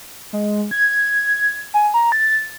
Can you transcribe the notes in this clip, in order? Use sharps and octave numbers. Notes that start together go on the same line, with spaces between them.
G#3
G#6
G#5
A#5
A6